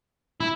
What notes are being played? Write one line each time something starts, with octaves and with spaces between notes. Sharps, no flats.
E4